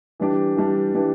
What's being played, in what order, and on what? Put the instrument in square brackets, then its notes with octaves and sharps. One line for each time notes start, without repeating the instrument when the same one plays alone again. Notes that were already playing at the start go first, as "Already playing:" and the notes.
[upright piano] E3 G3 D4 G4
E3 G3 D4 G4
E3 G3 D4 G4